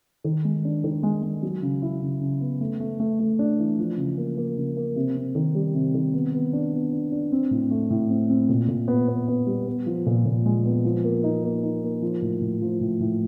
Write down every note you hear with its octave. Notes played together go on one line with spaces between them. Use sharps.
D#3
G#3
D4
D#3
G#3
G#3
F#3
C#3
E4
C#3
C#3
B3
A3
A3
A3
A3
D4
E3
F3
C#3
A#3
A#3
C#3
A#3
C3
C4
D#3
G3
C3
D#3
B3
B3
D4
B3
D4
D4
C4
A2
A3
A2
C4
C4
A#2
A#2
B3
B3
B3
G3
B3
F3
A#2
A#2
G#3
B3
F3
A#3
D#4
A#3
D#4
A#3
F3
A2
A2
F3
A2
A2